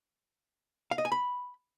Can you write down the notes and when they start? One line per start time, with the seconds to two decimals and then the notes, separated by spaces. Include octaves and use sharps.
0.91 F5
0.98 D#5
1.05 G#5
1.12 B5